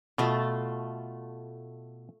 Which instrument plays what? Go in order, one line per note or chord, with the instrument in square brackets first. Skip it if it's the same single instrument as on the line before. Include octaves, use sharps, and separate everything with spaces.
[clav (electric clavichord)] B2 [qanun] A3 F4